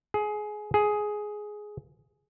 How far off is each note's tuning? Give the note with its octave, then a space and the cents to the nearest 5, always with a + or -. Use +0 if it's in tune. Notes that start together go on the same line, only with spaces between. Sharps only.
G#4 +20
G#4 +10